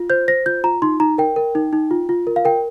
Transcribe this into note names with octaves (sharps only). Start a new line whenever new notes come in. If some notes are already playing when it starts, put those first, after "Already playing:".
Already playing: F4
C5 G6
C5 A#6
F4 G6
F4 A#5
D#4 C6
D#4 A#5
A#4 G5
A#4
D#4
D#4
F4
F4
A#4
F5
A#4 G5